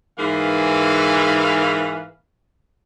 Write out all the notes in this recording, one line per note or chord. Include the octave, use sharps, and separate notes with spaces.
G#2 E3 A#3 B4 F5